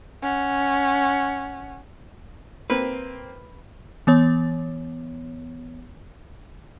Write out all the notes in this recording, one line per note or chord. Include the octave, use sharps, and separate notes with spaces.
C#4 F#5
A#3 C4 B4
E3 B3 C#5